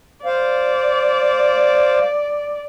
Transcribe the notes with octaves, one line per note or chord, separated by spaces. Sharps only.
C5 D5 F5